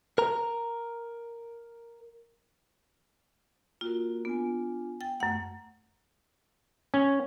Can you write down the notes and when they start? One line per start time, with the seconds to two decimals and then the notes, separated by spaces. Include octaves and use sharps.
0.18 A#4 A#5
3.81 A#3 F4 F#4 A#4
4.25 B3 D4 F4 G#5
5.01 G5 A6
5.20 F#2 A3 F#5
6.94 C#4